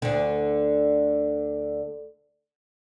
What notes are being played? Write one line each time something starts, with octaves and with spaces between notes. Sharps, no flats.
D2 D3